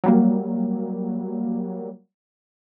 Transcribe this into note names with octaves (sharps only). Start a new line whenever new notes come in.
F#3 G3 A#3